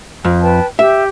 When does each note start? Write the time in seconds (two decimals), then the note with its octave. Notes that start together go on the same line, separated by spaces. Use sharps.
0.25 F2
0.42 B4 G5 A5
0.79 G4 E5